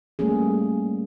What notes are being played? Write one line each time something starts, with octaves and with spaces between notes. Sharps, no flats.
G3 A3 A#3 C#4 G#4